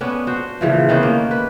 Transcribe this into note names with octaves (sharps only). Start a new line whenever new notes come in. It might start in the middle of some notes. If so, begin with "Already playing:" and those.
B3 C#4 D4
F#4 C5
A#2 C#3 E3 F3
D#3 B3 C#4 C5
A#3
B4